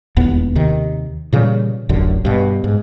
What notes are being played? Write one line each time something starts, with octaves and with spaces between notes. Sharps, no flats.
E1 D#2 A2 B3
D#2 C3 D#3
A#2 C#3 E3 G3
D1 A1 F#2 D3
G2 B2
G#2